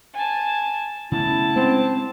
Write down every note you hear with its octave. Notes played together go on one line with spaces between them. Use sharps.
G#5 A5
C#3 A3 B3 E4 A5
G#3 C4 C#4